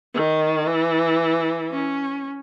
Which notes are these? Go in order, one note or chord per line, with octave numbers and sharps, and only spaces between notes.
D#3
E3
C#4